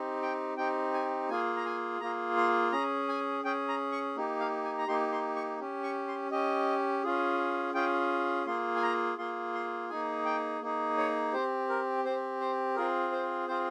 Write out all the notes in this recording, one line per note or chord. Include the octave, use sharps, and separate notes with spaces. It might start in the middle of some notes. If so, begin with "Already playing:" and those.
Already playing: C4 D#4 G4
G5
C4 D#4 G4 G5
G#5
A#3 F4 G#4 G#5
A#5
G#5
A#3 F4 G#4 A#5
C6
C#4 G#4 A#5
G#5
C#4 G#4 G5
A#5
C#6
A#3 D#4 G4
F5
G#5
A#5
A#3 D#4 G4 C6
C6
C#6
C#4 G4
C#6
C6
C#4 G4 D#5
C#4 F4 G#4
C#4 F4 G#4 G5
A#3 F4 G#4 C6
G#5
A#5
A#3 F4 G#4 C6
C6
A#3 D#4 G#4 G#5
G5
A#3 D#4 G#4
C#5
C4 G4 C5
A#4
C4 G4 C5
C5
C4 F4 G#4 A#4
C5
C4 F4 G#4 C5